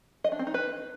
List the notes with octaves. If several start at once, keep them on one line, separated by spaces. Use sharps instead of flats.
D#5
D4
C4
D#4
B4